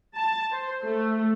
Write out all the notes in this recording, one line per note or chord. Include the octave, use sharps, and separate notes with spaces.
A5
C5
A3